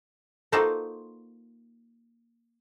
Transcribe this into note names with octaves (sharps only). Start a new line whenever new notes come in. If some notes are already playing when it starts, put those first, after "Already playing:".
A#3 D#4 F4 F#4 A4 C5